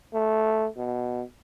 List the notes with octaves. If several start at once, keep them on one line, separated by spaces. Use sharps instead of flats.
A3
B2